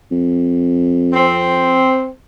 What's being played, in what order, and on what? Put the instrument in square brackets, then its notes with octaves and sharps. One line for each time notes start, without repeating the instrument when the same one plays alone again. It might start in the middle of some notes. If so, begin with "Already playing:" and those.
[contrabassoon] F2
[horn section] C4